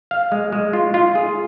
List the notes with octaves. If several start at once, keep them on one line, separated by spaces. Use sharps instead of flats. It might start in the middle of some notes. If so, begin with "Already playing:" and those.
F5
G#3
G#3
F4
F4
G#4